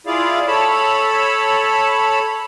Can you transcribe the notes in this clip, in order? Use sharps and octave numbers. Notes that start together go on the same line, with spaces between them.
E4 F4 G#4 D5 F5
A4 C#5 A5 B5